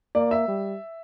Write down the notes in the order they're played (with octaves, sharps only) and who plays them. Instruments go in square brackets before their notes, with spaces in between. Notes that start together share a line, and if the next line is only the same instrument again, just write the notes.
[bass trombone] A#3 [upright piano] D5
[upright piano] E5
[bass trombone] G3